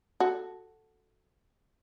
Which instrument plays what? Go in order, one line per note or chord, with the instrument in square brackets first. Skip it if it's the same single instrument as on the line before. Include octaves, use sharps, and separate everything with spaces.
[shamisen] F#4 A4